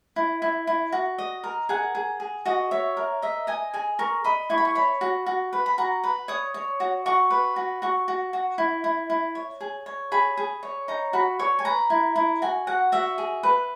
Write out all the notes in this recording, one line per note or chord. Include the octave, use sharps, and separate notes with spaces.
E4
E4
E4
F#4
D#5
A#4
G#4 F#5
G#4
G#4
F#4 D#5
C#5 E5
A#4
D#5 E5
D#5 G#5
G#4 G#5
A#4 C#6
D#5 B5
E4 C#6
B5
C#6
C#5 B5
F#4
F#4
B4
B5
F#4 A#5
B4
C#5 D#6
C#5
F#4
F#4 C#6
B4
F#4
F#4 C#6
F#4
F#4
E4
E4
E4
C#5
G#4
C#5
G#4 B5
G#4
C#5
D#4 A#5
F#4 B5
C#5 C#6
G#5
B4 A#5
E4
E4
F#4 G#5
F#4 F#5
F#4 E5
G#4
B4